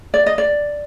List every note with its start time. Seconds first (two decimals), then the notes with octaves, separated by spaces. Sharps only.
0.14 D5
0.26 D#5
0.38 D5